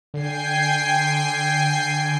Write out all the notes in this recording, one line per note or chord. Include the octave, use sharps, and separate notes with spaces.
D3 G5 G#5 C7